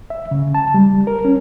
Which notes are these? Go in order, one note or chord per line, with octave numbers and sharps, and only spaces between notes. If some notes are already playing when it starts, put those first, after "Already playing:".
E5
C#3
A5
G3
A#4
C#4